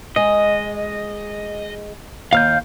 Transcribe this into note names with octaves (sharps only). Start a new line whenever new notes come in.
G#3 D#5
D#2 F5 F6 G6